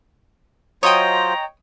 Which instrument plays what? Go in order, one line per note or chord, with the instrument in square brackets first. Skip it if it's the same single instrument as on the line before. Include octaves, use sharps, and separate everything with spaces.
[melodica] F#3 F4 C5 [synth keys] C#5 D#5 G5 [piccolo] A#5 [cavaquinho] D#6